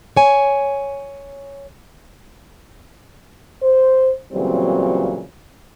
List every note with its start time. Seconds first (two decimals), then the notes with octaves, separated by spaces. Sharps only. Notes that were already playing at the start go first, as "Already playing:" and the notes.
0.17 C#5 G#5
3.62 C5
4.32 A#2 C#3 E3 F#3 G3 C4